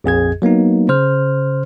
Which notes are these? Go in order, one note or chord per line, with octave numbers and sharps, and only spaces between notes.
A#1 F2 G#4 G#6
F#3 A#3 B3 D#4
C#3 C5 F6